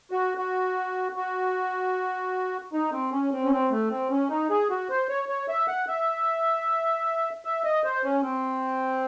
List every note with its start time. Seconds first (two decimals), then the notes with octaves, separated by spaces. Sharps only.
0.11 F#4
0.37 F#4
1.16 F#4
2.73 D#4
2.92 C4
3.12 C#4
3.32 C4
3.44 C#4
3.52 C4
3.71 A3
3.90 C4
4.11 C#4
4.30 D#4
4.50 G#4
4.70 F#4
4.90 C5
5.09 C#5
5.29 C#5
5.49 E5
5.67 F#5
5.88 E5
7.45 E5
7.64 D#5
7.84 C5
8.04 C#4
8.23 C4